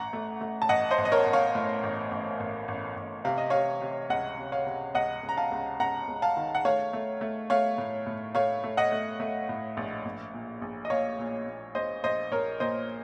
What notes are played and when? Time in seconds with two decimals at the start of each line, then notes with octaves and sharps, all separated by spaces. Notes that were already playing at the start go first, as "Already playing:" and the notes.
Already playing: A1 F#5 A#5
0.13 A3
0.41 A3
0.62 A5
0.69 A1 D#5 F#5
0.91 C5 D#5
0.98 A1
1.05 D#5
1.12 A#4 C#5
1.26 A1
1.33 C#5 F5
1.55 A2
1.83 A1
2.11 A1
2.40 A1
2.68 A1
2.96 A1
3.25 C3 F5
3.38 D#5
3.50 C3 C#5 F5
3.82 C3
4.10 C#2 D#5 F#5
4.38 C3
4.52 C#5 F5
4.66 C3
4.95 C#2 D#5 F#5
5.23 C#2
5.29 A#5
5.37 F5 A5
5.52 C#2
5.80 C#2 F#5 A#5
6.08 C#2
6.22 F5 A5
6.37 D#3
6.55 F#5
6.65 A3 C#5 F5
6.93 A3
7.21 A3
7.50 A3 C#5 F5
7.78 A2
8.07 A2
8.35 A3 C#5 F5
8.64 A3
8.77 D#5 F#5
8.92 A3
9.20 A3
9.49 A2
9.77 A#1
10.05 A#1
10.33 A#2
10.62 A#1
10.85 D#5
10.90 A#2 C#5 F5
11.19 A#2
11.47 A#2
11.75 A#1 C5 D#5
12.04 A#1 C5 D#5
12.32 A#1 A#4 C#5
12.60 A#2 C5 D#5